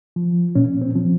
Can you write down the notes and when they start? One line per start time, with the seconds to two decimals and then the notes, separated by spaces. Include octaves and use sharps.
0.16 F3
0.55 A#2 C#4
0.82 C4
0.95 F3